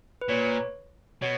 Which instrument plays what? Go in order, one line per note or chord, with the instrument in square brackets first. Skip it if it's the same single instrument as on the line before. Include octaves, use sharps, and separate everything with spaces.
[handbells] B4
[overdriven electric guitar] A#2 [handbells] C#5
[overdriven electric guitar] B2 [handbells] C#5